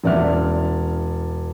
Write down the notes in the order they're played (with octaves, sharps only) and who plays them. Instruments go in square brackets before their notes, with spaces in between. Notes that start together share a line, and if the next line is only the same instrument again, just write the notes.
[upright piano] E1 C#4 D5 E5 F6